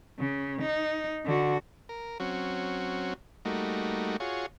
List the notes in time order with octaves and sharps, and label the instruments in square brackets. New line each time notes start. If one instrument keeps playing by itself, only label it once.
[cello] C#3
D#4
D3 F#4
[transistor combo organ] A#4
F#3 C4 C#4 F#4
G3 A3 A#3 D#4 F#4
F4 F#4 G#4 C#5